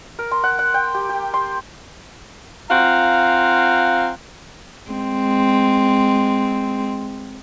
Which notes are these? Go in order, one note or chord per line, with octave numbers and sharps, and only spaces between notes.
A#4
C6
F#5
F#5
G5
G4
G4
C6
C4 F4 F5 F#5 A#5
G#3 C4